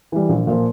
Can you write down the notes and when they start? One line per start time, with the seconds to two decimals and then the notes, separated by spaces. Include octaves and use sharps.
0.12 E3 G3
0.29 A#1
0.47 A#2 F3